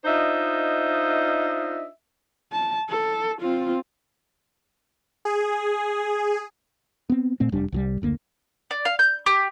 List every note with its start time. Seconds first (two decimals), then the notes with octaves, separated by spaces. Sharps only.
0.05 D4 D#4 F4 C5 D#5 E5
2.52 A5
2.89 A4
3.41 C4 F4
5.25 G#4
7.10 B3 C4
7.40 A#2 A3 C4
7.52 F1 G3 D4
7.72 C2 E3 G3
8.02 F#1 D2 A#3
8.71 D5
8.85 F5
8.99 G6
9.26 G4